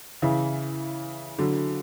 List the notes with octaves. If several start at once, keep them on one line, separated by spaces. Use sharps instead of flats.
C#3 E3
D3 F#3